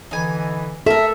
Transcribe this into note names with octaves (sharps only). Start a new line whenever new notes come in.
D3 E3 D#4 G#5
A4 A#4 E5